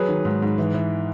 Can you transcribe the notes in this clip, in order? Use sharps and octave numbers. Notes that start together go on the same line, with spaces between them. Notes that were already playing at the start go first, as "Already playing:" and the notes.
Already playing: F#3 G#4 B4
D#3
G#2
G#2
E3
E3